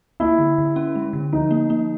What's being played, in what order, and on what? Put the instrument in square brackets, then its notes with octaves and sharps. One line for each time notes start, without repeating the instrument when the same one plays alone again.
[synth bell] A#3 [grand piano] E4
[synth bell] D3
D3
C#4
G#3
D3
[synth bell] F3 [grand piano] D#4
[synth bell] A#3
A#3